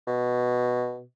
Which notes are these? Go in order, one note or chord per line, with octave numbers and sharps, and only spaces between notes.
B2